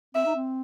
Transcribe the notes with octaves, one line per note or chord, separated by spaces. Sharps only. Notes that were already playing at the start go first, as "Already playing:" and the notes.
C4 E5
D#4
C4